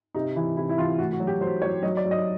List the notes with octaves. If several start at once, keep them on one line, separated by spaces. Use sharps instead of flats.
C3 D#4
E3 E4
C3 E4
E4
E3 F4
A2 F#4
F#4
F#3
G4
F#3 C5
F#3 C#5
F#3 D#5
D5
F#3
D#5